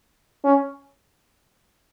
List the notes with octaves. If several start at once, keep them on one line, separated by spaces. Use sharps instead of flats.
C#4